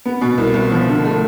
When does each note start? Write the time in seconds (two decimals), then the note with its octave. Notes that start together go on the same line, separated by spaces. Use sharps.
0.05 B3
0.21 B2
0.38 C2
0.54 C2
0.71 F3
0.87 D3
1.04 A3